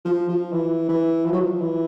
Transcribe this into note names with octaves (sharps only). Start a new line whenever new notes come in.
F3
F3
E3
E3
F3
F#3
F3
E3